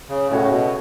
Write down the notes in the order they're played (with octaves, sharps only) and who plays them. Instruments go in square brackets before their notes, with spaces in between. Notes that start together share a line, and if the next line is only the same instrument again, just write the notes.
[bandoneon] C#3
[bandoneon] A2 [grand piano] C#3 A3 C#4 F#4 C#5
[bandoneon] B2